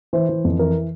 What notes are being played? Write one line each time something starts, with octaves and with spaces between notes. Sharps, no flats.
E3 C5
E3
F2
E3 A#4